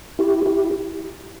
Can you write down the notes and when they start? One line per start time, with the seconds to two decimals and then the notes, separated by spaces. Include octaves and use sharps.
0.19 E4 G4
0.46 E4 G4